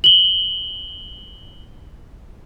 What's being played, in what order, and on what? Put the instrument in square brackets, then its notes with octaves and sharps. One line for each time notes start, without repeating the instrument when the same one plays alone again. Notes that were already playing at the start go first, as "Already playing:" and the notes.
[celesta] F#7 G7